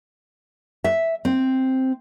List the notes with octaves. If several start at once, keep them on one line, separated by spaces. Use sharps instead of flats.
E5
C4